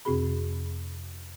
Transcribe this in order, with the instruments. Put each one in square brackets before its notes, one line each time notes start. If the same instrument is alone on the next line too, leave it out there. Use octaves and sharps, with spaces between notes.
[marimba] F2 C3 C4 F#4 G#4 B5